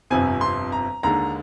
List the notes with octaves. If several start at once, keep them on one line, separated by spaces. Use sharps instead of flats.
G1 F2 C3 G#5
C6
A#5
D#2 D3 G#3 A#5